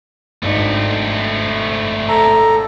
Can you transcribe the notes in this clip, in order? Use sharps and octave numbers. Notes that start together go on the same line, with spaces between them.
G#1 A3 C4 D4 D#4
A4 A#5